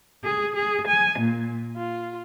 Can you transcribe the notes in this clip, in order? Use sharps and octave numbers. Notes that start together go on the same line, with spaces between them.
G#4
G#4
G#5
A#2
F4